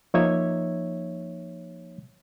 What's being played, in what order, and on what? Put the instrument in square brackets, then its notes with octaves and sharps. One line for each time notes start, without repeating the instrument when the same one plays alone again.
[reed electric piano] F3 A#3 D#4 C#5 E5 G#6